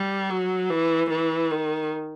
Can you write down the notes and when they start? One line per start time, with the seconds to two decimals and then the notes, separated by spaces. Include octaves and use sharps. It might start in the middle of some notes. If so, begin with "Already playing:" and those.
Already playing: G3
0.29 F#3
0.70 E3
1.10 E3
1.52 D#3